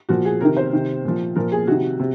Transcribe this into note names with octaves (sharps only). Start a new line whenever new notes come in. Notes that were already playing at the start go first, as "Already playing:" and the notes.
A#2 F3 F#4
G#4
C3 D#3 A#4
C5
C3 D#3
A#2 F3
A#2 F3 A#4
G#4
C3 D#3 F#4
C3